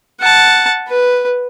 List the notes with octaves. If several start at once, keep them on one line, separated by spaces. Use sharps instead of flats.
F#5 A5
B4